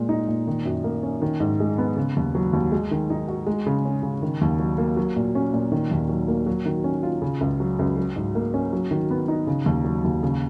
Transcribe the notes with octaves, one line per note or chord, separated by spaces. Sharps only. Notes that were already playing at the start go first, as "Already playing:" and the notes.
Already playing: A#2 G#3
D#4
A#2
D#3
F#2
A#3
C#4
D#3
G#2
G#3
B3
C#3
D#2
F#3
D#2
G#3
D#3
D#4
F#4
G#3
C#3
C#4
C#3
D#3
D#2
F#3
A#3
F#3
A#2
C#4
A#2
D#3
D#2
F#3
A#3
F#3
D#3
C#4
F4
C#3
C#2
F#3
C#2
F#3
G#2
A#3
C#4
F#3
D#3
B3
D#4
C#3
D#2
F#3
D#2
C#3